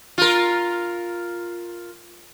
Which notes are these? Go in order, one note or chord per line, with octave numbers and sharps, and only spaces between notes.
F4 A#4